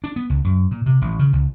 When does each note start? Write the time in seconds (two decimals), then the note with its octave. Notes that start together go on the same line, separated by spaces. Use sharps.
0.04 D4
0.16 B3
0.30 C#2
0.44 F#2
0.71 A#2
0.86 C3
1.02 A1
1.19 C#3
1.33 C#2